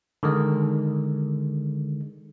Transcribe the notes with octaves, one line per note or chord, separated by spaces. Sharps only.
D3 D#3 G#3